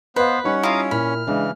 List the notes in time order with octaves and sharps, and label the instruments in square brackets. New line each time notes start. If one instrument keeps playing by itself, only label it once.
[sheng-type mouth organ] B3 C5 [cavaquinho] B4 [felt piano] D#5 F5
[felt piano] G3 D#4 C#6 [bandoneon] C#4 C#5 [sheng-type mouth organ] F#5
[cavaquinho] E4 F4 [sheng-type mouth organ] F5 A#5 D#6
[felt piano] A#2 A#3 E4 [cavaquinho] B5 [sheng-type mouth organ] F6
[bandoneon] C#3 E3 [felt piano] G#3 D4